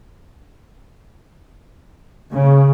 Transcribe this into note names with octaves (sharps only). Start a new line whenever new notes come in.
C#3